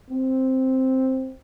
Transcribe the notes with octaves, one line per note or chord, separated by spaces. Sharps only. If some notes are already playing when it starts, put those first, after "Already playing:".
C4